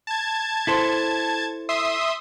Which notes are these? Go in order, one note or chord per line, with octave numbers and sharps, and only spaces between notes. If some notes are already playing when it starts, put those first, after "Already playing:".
A5 G#6
E4 A4 C5
E5 C6 D#6